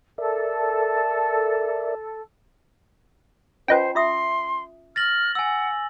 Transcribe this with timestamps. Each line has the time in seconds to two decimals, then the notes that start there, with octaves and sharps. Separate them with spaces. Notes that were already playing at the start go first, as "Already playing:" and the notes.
0.18 A4 A#4 D5 E5
3.68 C#4 F4 B4 C5 D#5 G5 G#5
3.95 F4 E5 C6 D#6
4.96 F6 A6 A#6 F#7
5.35 F#5 G#5 E6